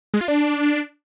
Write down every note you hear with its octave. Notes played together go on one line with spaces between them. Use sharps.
G#3
F4
D4